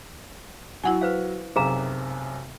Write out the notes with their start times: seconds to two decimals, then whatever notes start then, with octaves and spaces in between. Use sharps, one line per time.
0.84 F#3 E4 F#5 G#5
1.01 B4 C5 F5
1.56 B1 F#2 C3 G#4 F5 A#5